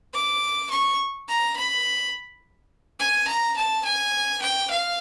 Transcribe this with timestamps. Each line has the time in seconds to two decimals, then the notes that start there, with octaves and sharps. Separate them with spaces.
0.14 D6
0.71 C#6
1.28 A#5
1.57 B5
2.99 G#5
3.28 A#5
3.57 A5
3.85 G#5
4.42 G5
4.70 F5